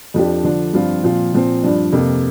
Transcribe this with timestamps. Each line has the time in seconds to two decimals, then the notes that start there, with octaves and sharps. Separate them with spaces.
0.14 F2 F3 D4 G4
0.43 D3 F3 D4
0.74 G2 F3 C4 F4
1.03 A#2 F3 C4 F4
1.33 A#2 F3 C4
1.63 G2 F3 D4
1.92 F2 C3 A#3